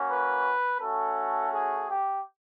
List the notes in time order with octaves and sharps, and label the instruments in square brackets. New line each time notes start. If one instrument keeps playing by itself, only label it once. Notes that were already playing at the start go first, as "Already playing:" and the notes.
Already playing: [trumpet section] A#3 C#4 F#4
B4
A3 C#4 F#4 A4
G#4
G4